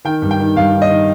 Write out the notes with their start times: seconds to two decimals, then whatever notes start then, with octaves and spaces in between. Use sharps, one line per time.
0.05 D#3 G5
0.22 G2
0.31 G5
0.40 D#3
0.56 G2 F5
0.73 D#3
0.82 D#5
0.91 D#3